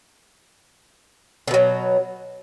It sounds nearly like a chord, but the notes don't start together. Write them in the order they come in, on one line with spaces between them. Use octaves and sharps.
D3 B2 F#3